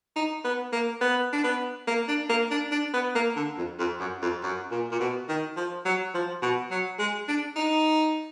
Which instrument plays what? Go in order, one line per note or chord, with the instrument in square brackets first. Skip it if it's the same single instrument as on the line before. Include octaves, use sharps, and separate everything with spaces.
[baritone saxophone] D#4
B3
A#3
B3
D4
B3
A#3
D4
A#3
D4
D4
B3
A#3
D3
F2
F2
F#2
F2
F#2
A#2
A#2
B2
D#3
F3
F#3
F3
B2
F#3
G#3
D4
D#4